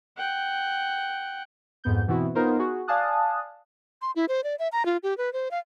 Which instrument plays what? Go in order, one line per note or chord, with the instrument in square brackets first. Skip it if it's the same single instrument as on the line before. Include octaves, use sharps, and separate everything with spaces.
[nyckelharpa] F#5 G5
[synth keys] F2 G#2 B3 G6
B2 E3 B3 C4 E4 F#4
B3 D#4 F4 A#4 C5
F#4 G#4
D5 F5 G#5 A5 D#6 F#6
[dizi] C6
E4
C5
D5
E5
A#5
F4
G4
B4
C5
F5